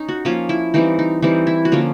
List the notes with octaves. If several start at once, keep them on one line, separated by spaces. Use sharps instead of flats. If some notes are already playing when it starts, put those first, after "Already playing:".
Already playing: C#4 D#4
F#4
F3 A#3 C#4 F4
E4
E3 G3 C4 D#4
D#4
E3 G3 C4 D#4
E4
F#4
D3 F3 A#3 C#4 F4